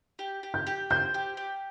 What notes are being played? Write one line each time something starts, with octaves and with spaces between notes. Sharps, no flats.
G4
G4
G6
G4
C5 G6
G4
G4